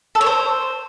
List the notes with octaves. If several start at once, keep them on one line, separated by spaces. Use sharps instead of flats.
A4
C#5
C5